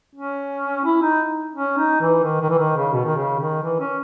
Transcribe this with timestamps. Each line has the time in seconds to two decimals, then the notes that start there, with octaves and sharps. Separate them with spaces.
0.16 C#4
0.85 E4
1.03 D#4
1.55 C#4
1.78 D#4
2.01 E3
2.24 D#3
2.41 D#3
2.50 E3
2.58 D#3
2.76 C#3
2.93 B2
3.05 D#3
3.16 C#3
3.39 D#3
3.62 E3
3.80 C#4